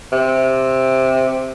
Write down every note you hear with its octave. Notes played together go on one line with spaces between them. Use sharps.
C3